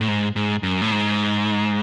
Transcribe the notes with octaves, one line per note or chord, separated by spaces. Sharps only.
A2
G#2
G#2
F#2
A2
G#2